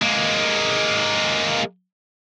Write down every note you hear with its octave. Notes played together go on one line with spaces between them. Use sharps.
G#3 A#3